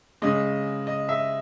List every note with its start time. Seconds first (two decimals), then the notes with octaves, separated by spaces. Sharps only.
0.22 C#3 G#3 D#5
0.87 D#5
1.09 E5